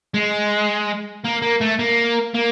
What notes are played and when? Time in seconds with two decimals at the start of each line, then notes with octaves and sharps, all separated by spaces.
0.14 G#3
1.24 A#3
1.42 A#3
1.61 A3
1.79 A#3
2.34 A#3